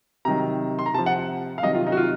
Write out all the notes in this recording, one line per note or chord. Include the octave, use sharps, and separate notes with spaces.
C3 D#3 F#3 A#5
C6
A#5
C3 F3 A5
F#5
F5
C3 D#3 F#3 D#5
F4
D#4
F#4
F4